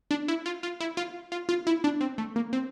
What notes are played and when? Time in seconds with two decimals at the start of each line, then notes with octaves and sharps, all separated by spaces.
0.11 D4
0.28 E4
0.46 F4
0.63 F4
0.80 E4
0.97 F4
1.32 F4
1.49 F4
1.67 E4
1.84 D4
2.01 C4
2.18 A3
2.36 A#3
2.53 C4